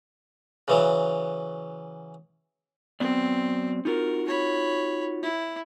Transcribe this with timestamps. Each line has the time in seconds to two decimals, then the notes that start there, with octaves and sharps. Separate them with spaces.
0.68 C#3 E3 F#3
3.00 F#3 B3 C4 D5
3.85 D#4 F4 F#4 A#4
4.27 C#5 B5
5.23 E4